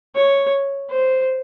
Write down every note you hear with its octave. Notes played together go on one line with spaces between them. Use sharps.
C#5
C5